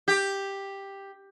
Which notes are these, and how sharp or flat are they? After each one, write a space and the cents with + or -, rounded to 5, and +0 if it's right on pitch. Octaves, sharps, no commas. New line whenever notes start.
G4 +5